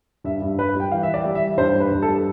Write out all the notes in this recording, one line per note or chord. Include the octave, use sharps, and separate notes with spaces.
G2 E5
G2
G3 B4
G3
G5
E3 F5
E3 E5
D5
G3
E5
E3
G2 C5
G3 B4
G2
A4
G3